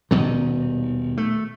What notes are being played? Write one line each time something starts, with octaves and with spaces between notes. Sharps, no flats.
D#1 B2 D#3
A3